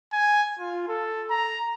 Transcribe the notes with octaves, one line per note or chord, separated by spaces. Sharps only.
G#5
F4
A4
A#5